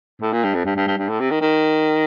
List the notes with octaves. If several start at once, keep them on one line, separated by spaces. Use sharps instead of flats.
A2
A#2
G2
F2
G2
G2
G2
G2
A2
C3
D#3
D#3